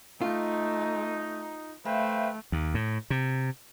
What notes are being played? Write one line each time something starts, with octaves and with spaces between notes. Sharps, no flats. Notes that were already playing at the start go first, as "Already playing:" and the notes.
A3 D#4 F4
A3 B4 C5 E5 F5 G5 B5
D#2
A2
C3